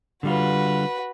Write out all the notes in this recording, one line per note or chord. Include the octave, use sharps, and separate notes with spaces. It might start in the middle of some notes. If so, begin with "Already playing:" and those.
D3 G3 F4 F#4 B4